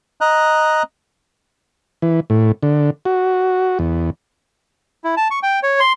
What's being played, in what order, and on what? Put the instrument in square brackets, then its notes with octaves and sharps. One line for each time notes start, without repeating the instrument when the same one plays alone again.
[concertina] D#5 A#5 F#6
[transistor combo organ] E3
A2
D3
F#4
E2
[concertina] E4
A5
C#6
G5
C#5
C6